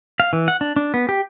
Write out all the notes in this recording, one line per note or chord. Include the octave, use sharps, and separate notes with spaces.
F5
E3
F#5
D4
D4
B3
G4